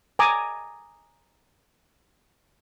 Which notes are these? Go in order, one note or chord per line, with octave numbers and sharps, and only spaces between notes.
G#5 A#5 D6 D#6